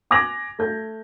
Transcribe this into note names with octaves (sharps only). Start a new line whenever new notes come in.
G#5 D6 G#6 A#6 F7 F#7
A3 G6